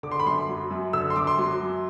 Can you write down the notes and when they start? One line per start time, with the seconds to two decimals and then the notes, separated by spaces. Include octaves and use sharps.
0.03 D3 D6
0.11 C6
0.20 B5
0.26 F#2 C6
0.49 F#3
0.70 F#2
0.93 D3 E6
1.10 C6
1.16 F#2 D6
1.27 C6
1.38 F#3
1.61 F#2